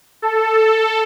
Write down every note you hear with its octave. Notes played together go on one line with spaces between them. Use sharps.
A4